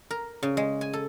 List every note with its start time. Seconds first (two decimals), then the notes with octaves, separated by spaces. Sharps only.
0.10 A#4
0.43 C#3
0.57 G#3
0.81 G#5
0.93 A4